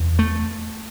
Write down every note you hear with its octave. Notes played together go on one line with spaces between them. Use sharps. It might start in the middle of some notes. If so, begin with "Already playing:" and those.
Already playing: E2 C3
A3